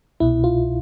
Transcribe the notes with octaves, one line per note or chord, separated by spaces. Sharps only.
C2 B2 E4
F4